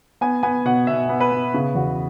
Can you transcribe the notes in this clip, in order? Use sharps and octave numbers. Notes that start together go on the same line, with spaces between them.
B3 G#5
B3 G#5
B2 F#5
B2 E5
B3
B4
B3
C#3
E2 F#4